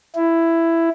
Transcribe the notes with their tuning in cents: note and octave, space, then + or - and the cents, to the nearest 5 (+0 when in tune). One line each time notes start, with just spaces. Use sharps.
E4 +10